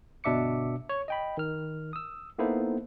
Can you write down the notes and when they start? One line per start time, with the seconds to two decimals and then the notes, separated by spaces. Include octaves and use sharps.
0.24 G1 B2 D4 E5 D6 C#7
0.89 C#5
1.08 D#5 G5 B5
1.37 D#3 F6
1.93 D#6 E6
2.39 A#3 B3 D#4 E4 A4 C5